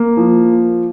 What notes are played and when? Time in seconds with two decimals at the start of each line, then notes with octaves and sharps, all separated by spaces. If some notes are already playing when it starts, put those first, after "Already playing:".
Already playing: A#3
0.17 F3